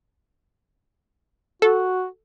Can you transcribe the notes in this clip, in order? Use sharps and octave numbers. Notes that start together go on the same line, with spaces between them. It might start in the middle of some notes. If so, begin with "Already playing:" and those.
F#4 A4